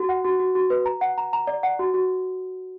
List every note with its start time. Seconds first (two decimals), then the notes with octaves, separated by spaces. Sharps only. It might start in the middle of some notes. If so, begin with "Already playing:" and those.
Already playing: F#4
0.09 F#5
0.25 F#4
0.40 F#4
0.55 F#4
0.70 B4
0.86 A#5
1.01 F#5
1.18 A#5
1.33 A#5
1.47 D5
1.63 F#5
1.79 F#4
1.94 F#4